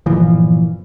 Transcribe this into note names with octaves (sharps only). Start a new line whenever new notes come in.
G1 A#2 E3 F3